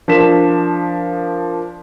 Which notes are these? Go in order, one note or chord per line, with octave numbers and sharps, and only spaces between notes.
F3 D4 A#4 B6 E7